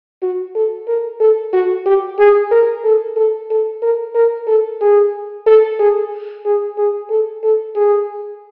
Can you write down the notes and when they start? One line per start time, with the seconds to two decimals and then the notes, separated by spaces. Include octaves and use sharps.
0.22 F#4
0.55 A4
0.87 A#4
1.20 A4
1.53 F#4
1.86 G4
2.19 G#4
2.52 A#4
2.84 A4
3.16 A4
3.50 A4
3.82 A#4
4.15 A#4
4.47 A4
4.81 G#4
5.47 A4
5.79 G#4
6.45 G#4
6.78 G#4
7.10 A4
7.43 A4
7.75 G#4